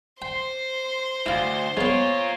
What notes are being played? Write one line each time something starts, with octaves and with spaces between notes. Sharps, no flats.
C5 G5 C6
D2 E4 F5
G#3 B3 F4 A#4 C#5